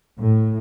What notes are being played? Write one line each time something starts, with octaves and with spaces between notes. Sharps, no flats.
A2